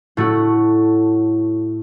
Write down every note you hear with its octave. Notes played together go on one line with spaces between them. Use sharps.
A2 A3 F#4